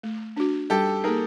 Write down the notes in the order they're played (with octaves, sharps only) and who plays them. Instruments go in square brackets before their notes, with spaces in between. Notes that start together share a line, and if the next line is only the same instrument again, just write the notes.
[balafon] A3
D4 F#4
[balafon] G3 [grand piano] G4 A4
[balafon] A#3 D#4 [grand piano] G#4 A#4